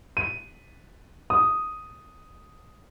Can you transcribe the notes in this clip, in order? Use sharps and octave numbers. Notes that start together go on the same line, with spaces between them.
D#7
D#6